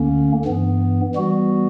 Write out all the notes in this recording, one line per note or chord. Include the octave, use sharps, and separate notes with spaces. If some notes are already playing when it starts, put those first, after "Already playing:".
Already playing: D2 D3 A#3 C#4
G2 E3 B3
E3 G3 B3 F#4